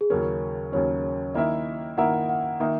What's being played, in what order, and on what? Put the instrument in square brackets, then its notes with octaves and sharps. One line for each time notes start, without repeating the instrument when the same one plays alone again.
[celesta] G#4
[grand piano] D#2 C#3 F#3 C#4 [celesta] A#4
[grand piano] D#2 C#3 F#3 C#4 [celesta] C#5
[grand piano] D#3 A#3 E4 A#4 E5 [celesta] D#5
[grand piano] D#3 A#3 E4 A#4 E5 [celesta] F#5
[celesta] F#5
[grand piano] D#3 A#3 D#4 [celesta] E5